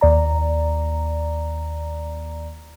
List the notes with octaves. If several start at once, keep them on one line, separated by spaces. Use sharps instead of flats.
D#2 D5 A#5